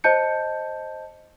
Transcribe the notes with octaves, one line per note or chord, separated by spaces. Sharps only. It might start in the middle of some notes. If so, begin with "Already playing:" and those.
C5 D#5 A5 G6 C#7